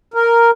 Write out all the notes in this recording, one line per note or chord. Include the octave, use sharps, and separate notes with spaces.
A#4